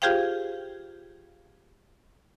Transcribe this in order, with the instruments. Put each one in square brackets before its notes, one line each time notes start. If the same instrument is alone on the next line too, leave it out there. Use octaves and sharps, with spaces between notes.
[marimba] F4 G4 G#4 C5 F5 G5